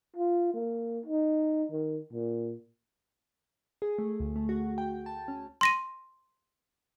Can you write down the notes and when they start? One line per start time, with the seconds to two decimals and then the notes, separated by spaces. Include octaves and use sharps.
0.16 F4
0.54 A#3
1.06 D#4
1.71 D#3
2.13 A#2
3.82 G#4
3.99 A3
4.20 D2
4.36 A3
4.49 F#4
4.78 G5
5.06 A5
5.28 C#4
5.61 C6 A#6 D#7